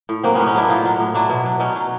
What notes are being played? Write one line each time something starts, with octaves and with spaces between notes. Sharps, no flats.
A2
F#3 A#3 C4
A2 B3 C#4
C#4 D#4
F#3 D4 E4
A2 D#4 F4
F#3
A2
F#3 D4 E4
B2
F#3
B2 C#4 D#4
F#3